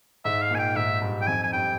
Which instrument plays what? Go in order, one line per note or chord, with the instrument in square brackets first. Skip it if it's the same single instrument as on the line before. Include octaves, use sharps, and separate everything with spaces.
[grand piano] G#2 [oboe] E5
[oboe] F5
[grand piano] A#2 [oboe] G#5
[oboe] G5
[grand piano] G#2 [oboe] E5
[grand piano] G2
[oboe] G5
[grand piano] F2 [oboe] G#5
[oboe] G#5
[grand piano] G2 [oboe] G5